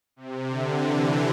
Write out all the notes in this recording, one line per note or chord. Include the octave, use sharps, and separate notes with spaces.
C3
D3
E3